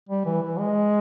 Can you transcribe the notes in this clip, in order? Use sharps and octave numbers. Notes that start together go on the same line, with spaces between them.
G3
E3
E3
G#3